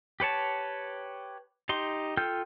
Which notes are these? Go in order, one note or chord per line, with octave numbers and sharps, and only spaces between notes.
G4 B4 C#5 A5
D#4 G4 C6
F4 A4 G5 F6 G6